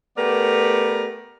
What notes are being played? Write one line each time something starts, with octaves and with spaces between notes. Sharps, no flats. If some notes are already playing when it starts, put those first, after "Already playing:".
A3 B3 G4 A#4 B4 D5